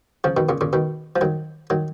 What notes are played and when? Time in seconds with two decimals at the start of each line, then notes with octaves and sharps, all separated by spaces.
0.24 C#3 F3
0.37 B2 D#3
0.49 A#2 C#3
0.61 A#2 C#3
0.73 B2 D#3
1.16 F3
1.21 D#3 F#3
1.70 D#3 F#3